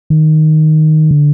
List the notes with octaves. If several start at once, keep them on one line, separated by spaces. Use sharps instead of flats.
D#3
D3